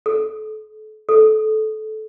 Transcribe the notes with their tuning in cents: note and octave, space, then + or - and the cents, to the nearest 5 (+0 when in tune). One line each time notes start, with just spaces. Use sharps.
A4 -35
A4 -20